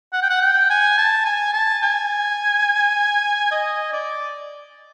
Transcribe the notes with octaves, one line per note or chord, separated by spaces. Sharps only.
F#5
G5
F#5
G5
G#5
A5
G#5
A5
G#5
D#5
D5